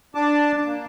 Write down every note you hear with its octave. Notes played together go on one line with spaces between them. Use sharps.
D4 A5 D6
A#3